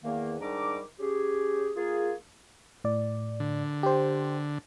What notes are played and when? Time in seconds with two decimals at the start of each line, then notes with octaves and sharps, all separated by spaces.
0.03 E2 D#3 A#3
0.40 G#2 D#3 G3 D4 A#5 D6
0.99 C#4 G4 G#4
1.76 A#3 F4 G#4
2.84 A2 D5
3.40 D3
3.83 G4 C5